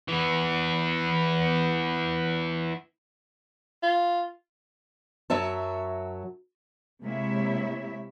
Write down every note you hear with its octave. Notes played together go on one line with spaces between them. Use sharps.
E3 B3
F4
F#2 F#3 C#5 E5 A5
C3 G#3 A#3 E4 C#5 E5